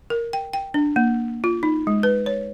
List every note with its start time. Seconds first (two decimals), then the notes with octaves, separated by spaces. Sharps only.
0.10 A#4
0.33 G5
0.53 G5
0.74 D4
0.96 A#3
1.44 F4
1.63 D#4
1.87 G#3
2.03 B4
2.26 C#5